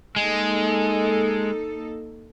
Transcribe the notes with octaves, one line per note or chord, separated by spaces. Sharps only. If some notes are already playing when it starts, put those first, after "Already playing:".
G#3 A#3 D#4 A4